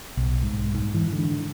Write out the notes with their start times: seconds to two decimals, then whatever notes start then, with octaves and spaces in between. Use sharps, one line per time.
0.17 B1
0.43 G#2
0.75 G#2
0.94 E3
1.12 D3